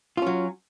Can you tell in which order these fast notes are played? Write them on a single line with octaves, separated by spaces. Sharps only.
F4 C#4 F#3